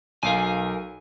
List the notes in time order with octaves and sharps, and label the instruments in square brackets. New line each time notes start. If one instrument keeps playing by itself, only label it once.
[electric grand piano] B1 [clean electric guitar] A#4 F5 G#5